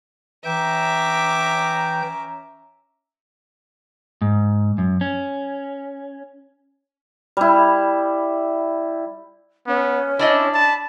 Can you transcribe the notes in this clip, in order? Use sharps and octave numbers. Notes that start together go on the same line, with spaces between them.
E3 C#4 E5 G5 A#5 D6 G6
G#2
F#2
C#4
G3 E4
B3 C#4
D4 E4 D5 D#5
A5 B5